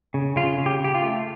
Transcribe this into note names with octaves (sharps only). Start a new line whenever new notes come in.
C#3
C#3 F4
C#3
G4
C#3 G4
F4
A3